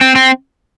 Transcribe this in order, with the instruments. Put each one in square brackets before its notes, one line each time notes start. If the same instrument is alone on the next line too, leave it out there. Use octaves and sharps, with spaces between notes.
[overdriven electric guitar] C4
C4